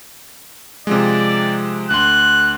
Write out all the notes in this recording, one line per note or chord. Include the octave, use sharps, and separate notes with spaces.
C3 F3 G#3 D5
D2 C6 F#6